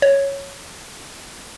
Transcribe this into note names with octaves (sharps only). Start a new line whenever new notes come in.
C#5